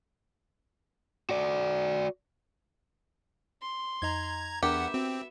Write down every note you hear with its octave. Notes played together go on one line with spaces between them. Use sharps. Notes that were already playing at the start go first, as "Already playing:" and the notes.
F#4 D5
C6
F2 D#4 D#5 A#5 G#6
E2 B3 D4 G4 A#4 E5 F#5 A#5
C4 F#4